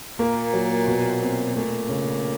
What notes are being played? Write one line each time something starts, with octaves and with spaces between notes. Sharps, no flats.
A#2 A#3
F#3
B2
C4
A#2 A3
C#3